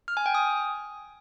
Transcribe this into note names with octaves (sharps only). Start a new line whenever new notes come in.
F6
G#5
G5
D#6